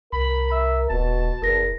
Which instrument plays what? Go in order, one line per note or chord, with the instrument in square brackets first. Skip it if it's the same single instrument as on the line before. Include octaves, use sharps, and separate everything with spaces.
[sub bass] C2 [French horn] A#4 [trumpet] B5
[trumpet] E5
[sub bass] D#1 [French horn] B2 [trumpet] A5
[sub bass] F#1 [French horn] E2 [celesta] A#4 A#6